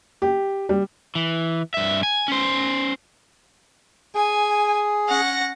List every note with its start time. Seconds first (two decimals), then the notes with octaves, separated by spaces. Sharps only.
0.22 G4
0.69 G3
1.15 E3
1.74 G2 E5
2.03 G#5
2.28 C#4 C5
4.15 G#4 G#5
5.07 C#4 F#5 A#6